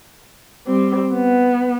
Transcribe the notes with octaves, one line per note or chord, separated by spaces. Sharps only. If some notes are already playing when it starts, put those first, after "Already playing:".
G3 C4
B3